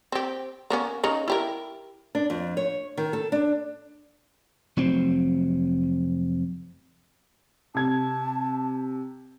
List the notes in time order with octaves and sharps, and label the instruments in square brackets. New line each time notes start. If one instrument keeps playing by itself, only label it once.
[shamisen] C4 G4
A#3 B3 C#4
C#3 D#4 C#5
E4 G4 A#4
[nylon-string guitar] D4
F2
C#5
D#3
A4
D4
[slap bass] F1 F#3 C4
[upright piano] C3 G#6 [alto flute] A5